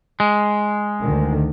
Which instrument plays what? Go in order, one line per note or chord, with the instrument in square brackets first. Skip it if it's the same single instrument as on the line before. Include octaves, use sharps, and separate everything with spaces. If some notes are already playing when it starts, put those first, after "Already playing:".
[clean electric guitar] G#3
[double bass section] D2 D3 D#3